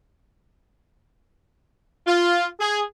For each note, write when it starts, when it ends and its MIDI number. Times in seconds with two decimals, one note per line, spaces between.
2.07 2.47 65
2.60 2.83 68